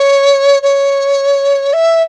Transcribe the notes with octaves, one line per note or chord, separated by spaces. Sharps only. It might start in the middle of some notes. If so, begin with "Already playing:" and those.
Already playing: C#5
C#5
E5